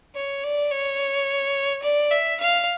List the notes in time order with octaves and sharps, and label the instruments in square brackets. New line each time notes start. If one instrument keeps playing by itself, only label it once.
[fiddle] C#5
D5
C#5
D5
E5
F5